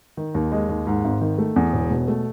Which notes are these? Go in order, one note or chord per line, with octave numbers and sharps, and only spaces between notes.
D#3
D#2
G#3
D#2
G#2
G#1
D#3
A3
E2
E1
B2
A3